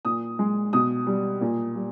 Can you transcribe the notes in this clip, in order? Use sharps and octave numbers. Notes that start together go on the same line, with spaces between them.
A#2 D#6
G#3
B2 D#6
G3
A#2
G3